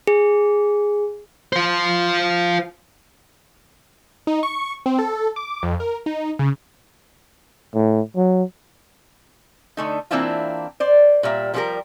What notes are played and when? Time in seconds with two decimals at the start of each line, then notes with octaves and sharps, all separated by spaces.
0.07 G#4
1.53 F4 C5
4.27 D#4
4.43 C#6
4.86 C4
4.99 A4
5.36 D6
5.63 F2
5.80 A#4
6.06 D#4
6.39 C#3
7.75 A2
8.17 F#3
9.77 D3 A3 D#4
10.11 E3 A#3 C4 D4 E4 F4
10.80 C5 D5
11.23 A#2 G3 A#3 E5
11.54 F3 G3 B3 E4 G4 A#4